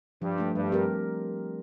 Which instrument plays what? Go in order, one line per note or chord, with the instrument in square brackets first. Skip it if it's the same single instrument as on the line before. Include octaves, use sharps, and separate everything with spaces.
[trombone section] G2 [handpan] F3
[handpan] A3 D4
[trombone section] G2 [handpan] G3
[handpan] C4 G4 A#4